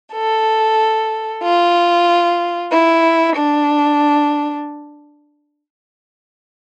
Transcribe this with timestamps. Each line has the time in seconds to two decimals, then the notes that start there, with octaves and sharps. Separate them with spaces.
0.13 A4
1.42 F4
2.71 E4
3.35 D4